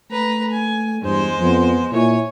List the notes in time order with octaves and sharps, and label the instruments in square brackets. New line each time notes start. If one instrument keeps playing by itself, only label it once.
[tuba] A3 [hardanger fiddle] B4 A#5
[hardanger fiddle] G#5
[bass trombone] E2 [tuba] G2 [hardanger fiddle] G#3 C5
[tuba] F2 [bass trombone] B3
[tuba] A#2 [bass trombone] E4 [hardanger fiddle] C#5 G#5